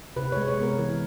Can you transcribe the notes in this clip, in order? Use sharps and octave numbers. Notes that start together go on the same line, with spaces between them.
C3 B4
C#5
G#3
C#5
B3
A#4
E3